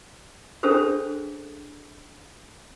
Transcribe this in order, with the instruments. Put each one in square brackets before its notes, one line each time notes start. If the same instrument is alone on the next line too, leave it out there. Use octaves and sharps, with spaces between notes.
[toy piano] C#4 D4 G#4 A4 B4 C5